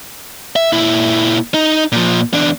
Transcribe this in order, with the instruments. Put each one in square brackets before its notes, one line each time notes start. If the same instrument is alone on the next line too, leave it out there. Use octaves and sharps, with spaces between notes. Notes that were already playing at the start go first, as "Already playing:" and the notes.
[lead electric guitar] E5
A#2 E4
D#4
A#2 F3
E2 D4